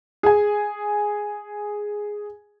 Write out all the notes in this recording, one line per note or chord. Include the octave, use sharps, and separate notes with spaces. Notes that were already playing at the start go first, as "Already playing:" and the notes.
G#4 G#5